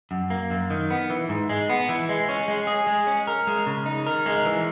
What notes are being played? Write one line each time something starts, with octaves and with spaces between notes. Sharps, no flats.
F#2
A#3
F#2
D#3
B3
E3
G#2
G#3
B3
E3
G#3
C#4
G#3
G#4
G#3
C#4
A#4
G#3
C#3
D#4
A#4
G#3
E3